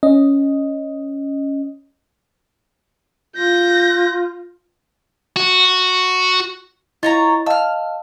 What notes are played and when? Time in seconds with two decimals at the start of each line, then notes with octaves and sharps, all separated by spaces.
0.03 C#4 D#5
3.37 F4 G6 A#6
5.36 F#4
7.03 E4 F4 C#5 D#5 A#5 A6
7.46 D#5 F5 A5 E6 F6